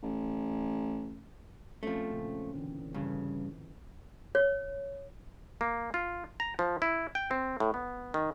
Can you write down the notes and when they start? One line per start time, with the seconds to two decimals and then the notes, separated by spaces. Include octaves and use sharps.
0.03 A1
1.83 F3 A3 C4 C#4
2.10 A#2 C#3
2.55 D3 E3
2.94 G2 C#3
4.35 C#5
5.61 A#3
5.94 F4
6.40 A#5
6.59 F3
6.82 E4
7.15 G5
7.31 C4
7.60 A2
7.74 B3
8.14 D#3